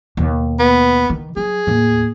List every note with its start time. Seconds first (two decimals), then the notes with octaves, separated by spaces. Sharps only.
0.17 D#2 B2
0.59 B3
1.10 D#3
1.37 F#3 G#4
1.67 D#2 A2